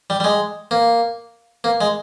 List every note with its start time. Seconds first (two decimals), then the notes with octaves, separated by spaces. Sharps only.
0.10 G3
0.20 G3
0.24 G#3
0.71 A#3
1.64 A#3
1.81 G#3